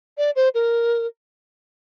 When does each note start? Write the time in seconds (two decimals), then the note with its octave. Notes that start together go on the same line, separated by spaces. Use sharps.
0.18 D5
0.36 C5
0.55 A#4